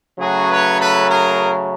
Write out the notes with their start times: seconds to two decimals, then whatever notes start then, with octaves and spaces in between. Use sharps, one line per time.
0.19 C#3 F#3 A3 C#4 F#4 G#4
0.48 B4 C#5
0.78 A4 B4
1.08 G#4 A#4